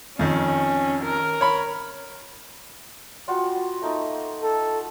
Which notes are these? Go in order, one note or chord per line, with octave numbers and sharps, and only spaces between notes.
F2 D#3 C#4
A#4
C#5 B5
G3 F4 F#4
A3 A#3 D#4
A4